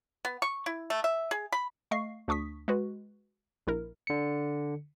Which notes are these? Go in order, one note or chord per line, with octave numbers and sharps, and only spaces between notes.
B3
C#6
E4
A3
E5
G#4
B5
A3 D#5 F5 C#6 C7
D2 D4 C#6 D#6 B6
G#3 F#4 B4
A#1 E4 A#4
D3 C#7